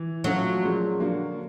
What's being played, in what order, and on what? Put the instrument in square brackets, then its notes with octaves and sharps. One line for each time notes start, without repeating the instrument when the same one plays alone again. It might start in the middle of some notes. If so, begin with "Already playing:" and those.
Already playing: [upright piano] E3
[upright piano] F3 A3 C#4 F4 [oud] F#3
[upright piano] A#2 F3 G#3 C#4
D3 F#3 A#3 D4 F#4